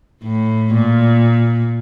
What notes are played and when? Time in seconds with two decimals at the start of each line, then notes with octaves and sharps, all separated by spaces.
0.23 A2
0.73 A#2